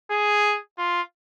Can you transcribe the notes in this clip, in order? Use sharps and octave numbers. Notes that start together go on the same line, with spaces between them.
G#4
F4